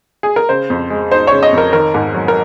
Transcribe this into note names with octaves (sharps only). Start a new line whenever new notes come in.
G#4
A#4
C#3 C5
F2
G#3
D#4 C5
C#3 C#5
D#5
F2
A#4
D#3 A#4
G#2
F#3
A#4